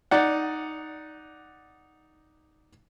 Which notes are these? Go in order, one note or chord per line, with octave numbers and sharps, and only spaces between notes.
D#4 D5 F#5